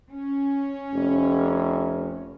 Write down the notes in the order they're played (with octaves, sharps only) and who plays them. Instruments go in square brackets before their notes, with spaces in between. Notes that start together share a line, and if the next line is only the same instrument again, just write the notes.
[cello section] C#4
[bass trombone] F1